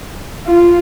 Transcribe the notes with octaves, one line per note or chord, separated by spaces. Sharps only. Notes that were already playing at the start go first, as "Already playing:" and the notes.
F4